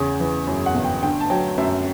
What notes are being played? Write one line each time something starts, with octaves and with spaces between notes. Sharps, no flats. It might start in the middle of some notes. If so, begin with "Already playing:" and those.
Already playing: E2 C#3 C#5
E3
F#2
F#5
G1
G5
D3 G5
A5
F#3 G5
F#2 E5